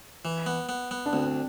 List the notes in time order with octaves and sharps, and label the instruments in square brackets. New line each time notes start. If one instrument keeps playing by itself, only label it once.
[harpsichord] E3
B3
B3
B3
[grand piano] D4
[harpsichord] D2 [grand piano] C4